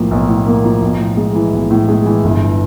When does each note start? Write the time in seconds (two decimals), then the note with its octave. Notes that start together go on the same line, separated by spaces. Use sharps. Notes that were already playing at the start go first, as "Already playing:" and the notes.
Already playing: B1 A2 F3 A#3
0.11 B1
0.28 A2
0.46 A#3
0.64 F3
0.82 B1
1.00 A2
1.17 G#3
1.35 E3
1.53 B1
1.71 A2
1.88 G#3
2.06 E3
2.24 G1